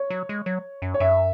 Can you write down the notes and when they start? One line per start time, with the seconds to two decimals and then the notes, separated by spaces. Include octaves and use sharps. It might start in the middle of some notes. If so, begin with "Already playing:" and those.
Already playing: C#5
0.10 F#3
0.29 G#3
0.46 F#3
0.82 F#2
0.94 C#5
1.00 F#2 E5